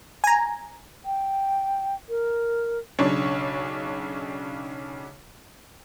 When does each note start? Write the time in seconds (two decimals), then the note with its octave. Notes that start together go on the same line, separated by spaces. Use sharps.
0.24 G#5 A#5
1.05 G5
2.09 A#4
2.99 B1 C#3 D4 C#5